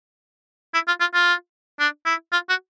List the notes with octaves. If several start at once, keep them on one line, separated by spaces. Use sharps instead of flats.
E4
F4
F4
F4
D4
E4
F4
F#4